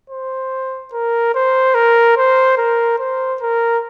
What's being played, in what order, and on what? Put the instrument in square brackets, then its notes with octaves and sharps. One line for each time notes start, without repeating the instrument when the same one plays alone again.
[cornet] C5
A#4
C5
A#4
C5
A#4
C5
A#4